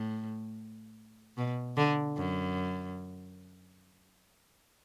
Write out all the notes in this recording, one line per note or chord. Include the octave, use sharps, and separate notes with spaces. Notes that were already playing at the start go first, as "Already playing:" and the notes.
Already playing: A2
B2
D3
F#2